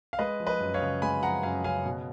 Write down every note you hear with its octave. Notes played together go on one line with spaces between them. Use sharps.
F5
G#3 B4 D#5
F3
B4 D#5
F#2
C#5 F5
C#3
G#3 G#5 B5
F3 F#5 A#5
F#2 F5 G#5
C#3 F5 G#5
B2